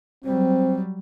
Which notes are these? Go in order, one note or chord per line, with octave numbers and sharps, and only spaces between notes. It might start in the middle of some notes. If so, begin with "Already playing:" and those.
F#3 G3 C4